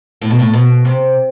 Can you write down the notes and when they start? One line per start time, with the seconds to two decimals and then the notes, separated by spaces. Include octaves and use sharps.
0.22 A2
0.30 B2
0.39 A2
0.53 B2
0.85 C3